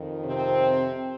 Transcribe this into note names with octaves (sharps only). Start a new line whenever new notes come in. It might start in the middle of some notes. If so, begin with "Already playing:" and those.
Already playing: F2 D#3
C3 C4